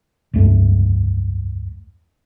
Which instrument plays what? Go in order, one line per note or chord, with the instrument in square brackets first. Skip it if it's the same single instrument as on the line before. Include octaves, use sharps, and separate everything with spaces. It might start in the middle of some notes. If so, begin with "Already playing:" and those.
[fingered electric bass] F1 C#2 G2 A3